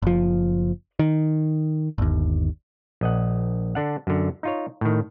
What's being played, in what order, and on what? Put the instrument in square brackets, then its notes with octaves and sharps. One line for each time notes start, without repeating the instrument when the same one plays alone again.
[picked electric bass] F#1 F3
D#3
G1 D#2
[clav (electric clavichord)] A#1 D#5 F#5
D3 D4 F#5
F#2 D3
D#4 F4 C#5
A2 D#3